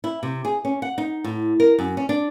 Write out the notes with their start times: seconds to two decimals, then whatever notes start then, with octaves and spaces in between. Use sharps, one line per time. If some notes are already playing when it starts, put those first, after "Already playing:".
0.04 E4
0.23 C3
0.45 G#4
0.65 C#4
0.82 F#5
0.98 D#4
1.24 A2
1.60 A#4
1.79 F#2
1.97 C#4
2.09 D4